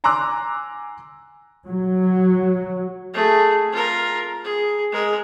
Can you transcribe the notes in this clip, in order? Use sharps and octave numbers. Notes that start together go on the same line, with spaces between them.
G#5 A#5 C6 D6 E6 F#6
F#3
A3 G#4
F4 A#4
G#4
G#3 A#4